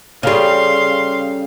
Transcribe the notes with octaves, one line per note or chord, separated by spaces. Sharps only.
C#3 G3 A4 C#5 F5 C6